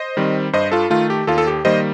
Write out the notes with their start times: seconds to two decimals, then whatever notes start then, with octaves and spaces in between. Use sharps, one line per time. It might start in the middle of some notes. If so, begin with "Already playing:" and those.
Already playing: C5 D#5
0.17 D#3 G3 C4
0.53 G2 C5 D#5
0.72 F4 A4
0.90 D#3 A3 F4
1.10 G4
1.27 D#2 F4 A4
1.38 A4
1.47 G4
1.65 D#3 G3 A#3 C5 D#5